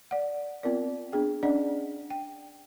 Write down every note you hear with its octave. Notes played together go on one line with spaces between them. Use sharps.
D5 F#5
B3 C4 F4 A#4 D5
B3 D4 G#4 G5
C#4 D4 D5 D#5 F#5
G5